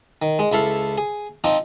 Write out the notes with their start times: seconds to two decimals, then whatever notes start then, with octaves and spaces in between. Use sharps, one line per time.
0.22 D#3
0.39 G#3
0.52 C#2 E4 A4 F5
0.98 G#4
1.44 F3 C4 D#4 D#6